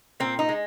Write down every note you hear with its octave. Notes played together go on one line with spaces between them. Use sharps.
A#2 C4
D#4
G#3